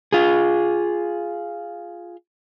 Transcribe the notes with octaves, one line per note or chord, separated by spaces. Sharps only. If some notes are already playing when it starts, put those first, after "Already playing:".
F4 G#4